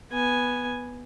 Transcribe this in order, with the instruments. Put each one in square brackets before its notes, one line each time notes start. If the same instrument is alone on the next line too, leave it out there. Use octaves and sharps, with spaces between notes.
[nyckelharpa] B3 G#5